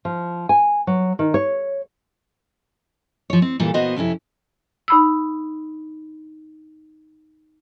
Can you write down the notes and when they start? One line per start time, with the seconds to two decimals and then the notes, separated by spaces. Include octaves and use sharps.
0.05 F3
0.49 G#5
0.87 F#3
1.19 D#3
1.34 C#5
3.30 F3 C#5
3.42 C4
3.60 A#2 E3 G3 A4
3.74 A#2 B3 F#4 C5 D#5
3.96 F2 C3 C#4 E4
4.88 D#4 B5 E6